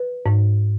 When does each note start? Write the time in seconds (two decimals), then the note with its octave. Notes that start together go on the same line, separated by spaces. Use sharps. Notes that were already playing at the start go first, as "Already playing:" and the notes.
Already playing: B4
0.26 G#2